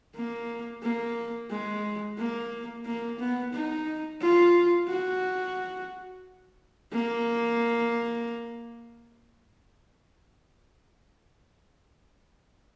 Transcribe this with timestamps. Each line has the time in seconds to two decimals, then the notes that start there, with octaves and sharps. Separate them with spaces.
0.15 A#3
0.83 A#3
1.51 G#3
2.18 A#3
2.86 A#3
3.20 B3
3.54 D#4
4.21 F4
4.88 F#4
6.92 A#3